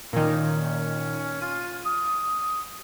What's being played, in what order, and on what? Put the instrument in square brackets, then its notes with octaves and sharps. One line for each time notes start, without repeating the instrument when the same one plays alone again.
[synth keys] A#2 D#3 [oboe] C#4
[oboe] F4 [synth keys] D#7
[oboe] D#6